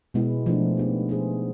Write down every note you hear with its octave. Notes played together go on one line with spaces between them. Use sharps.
B2 G#3 B3 E4
F3 A3 D4
B3 D#4 G4
B3 D#4 G#4 C5